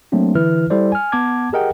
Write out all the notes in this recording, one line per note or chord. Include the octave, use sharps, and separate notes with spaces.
F#3 A3 A#3 C4 D4
D3 E3 E4 B4 F6
G3 E4 A4 C5 D5
G#5 F6
B3 F#5 A5 D6 G#6
G4 G#4 A#4 D#5 F#5 G5